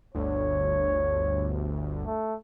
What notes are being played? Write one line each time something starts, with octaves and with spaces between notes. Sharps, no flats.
G1 D2 C#5
A3